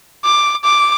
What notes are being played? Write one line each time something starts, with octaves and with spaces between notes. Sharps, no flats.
D6
D6